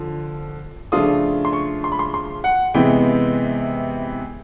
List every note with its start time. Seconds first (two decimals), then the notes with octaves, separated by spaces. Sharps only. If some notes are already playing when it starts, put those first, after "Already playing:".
Already playing: D3 F3
0.92 C#3 F3 A3 D4 F4 D#6
1.45 C6
1.53 C#6
1.84 C6
1.92 B5
1.99 C6
2.14 C6
2.44 F#5
2.74 C3 E3 G#3 B3 G5